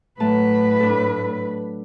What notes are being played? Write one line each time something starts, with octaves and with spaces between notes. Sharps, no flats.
A2 F#3 A3 B4 A5
D4 A4